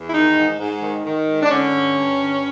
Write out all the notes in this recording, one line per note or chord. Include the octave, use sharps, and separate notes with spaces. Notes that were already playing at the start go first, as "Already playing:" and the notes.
Already playing: E2
E4
D#3 D#4
G#2
G#2
D#3
D#3
G#2
D4
D3 C#4
G2
G2
D3